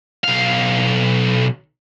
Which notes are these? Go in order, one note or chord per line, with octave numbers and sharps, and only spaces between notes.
B1 F5